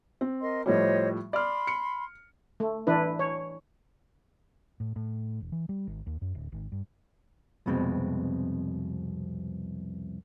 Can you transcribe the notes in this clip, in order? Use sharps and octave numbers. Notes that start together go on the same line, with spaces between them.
C4
A#4 D#5 C6
A2 F3 G3 C5 C#5 D#5
D5 B5 C6 F6
C#7
A3
E3 D4 E4 B4
C#5
A2
A2
E1
E3
G3
G#1
D#2
F#2
D1
G#1
G2
C2 F2 B2 G#3 C4